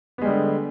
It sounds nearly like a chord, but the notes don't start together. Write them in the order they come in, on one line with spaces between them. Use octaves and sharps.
B3 G#3 G3 D3